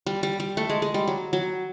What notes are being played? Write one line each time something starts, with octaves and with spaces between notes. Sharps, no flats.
G3
G3
G3
A3
G#3
G#3
G3
F#3
F#3